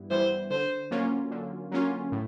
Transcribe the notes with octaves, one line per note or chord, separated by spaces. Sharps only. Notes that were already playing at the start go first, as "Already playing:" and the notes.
Already playing: G2 E3 G3 B3 E4
E3 G3 B3 E4 C5
D3 C5
F#3 A#3 C#4 F4
D3
F#3 A#3 C#4 F4
A2